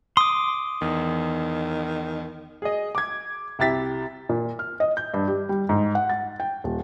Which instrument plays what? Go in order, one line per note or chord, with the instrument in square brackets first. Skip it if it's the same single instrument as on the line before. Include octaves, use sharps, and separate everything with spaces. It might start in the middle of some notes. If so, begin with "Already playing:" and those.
[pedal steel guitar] C6 D6 [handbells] D#6
[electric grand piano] E2 [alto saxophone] D#3
[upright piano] G#4 D#5
D6 G#6
C2 E4 G4 A6 B6
[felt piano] A#2
F6
D#5
G6
G2
G4
G3
G#2
F#5
A6
G5
D#1